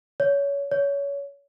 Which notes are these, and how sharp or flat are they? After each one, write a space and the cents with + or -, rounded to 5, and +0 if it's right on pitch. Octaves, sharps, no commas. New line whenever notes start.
C#5 +25
C#5 +25